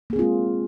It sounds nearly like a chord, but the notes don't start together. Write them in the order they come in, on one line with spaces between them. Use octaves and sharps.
A#3 G#4 C4 F4 G#3